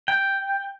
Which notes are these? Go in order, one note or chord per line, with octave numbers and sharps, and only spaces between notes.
G5